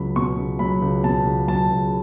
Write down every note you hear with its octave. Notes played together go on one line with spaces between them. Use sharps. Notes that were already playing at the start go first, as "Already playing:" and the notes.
Already playing: C#2 F#3 B5
B2 C#6
C#2
F#3 B5
C#2
B2 A5
C#2
F#3 A5
C#2